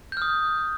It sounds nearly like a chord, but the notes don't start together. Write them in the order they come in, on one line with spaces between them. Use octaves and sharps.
G6 F6 D#6